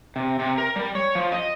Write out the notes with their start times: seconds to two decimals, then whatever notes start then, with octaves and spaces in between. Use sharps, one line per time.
0.16 C3
0.39 C3
0.58 A#4
0.76 G3
0.95 C#5
1.15 F3
1.32 D#5